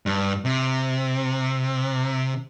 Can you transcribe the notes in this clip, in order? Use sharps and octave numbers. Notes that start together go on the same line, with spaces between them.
G2
C3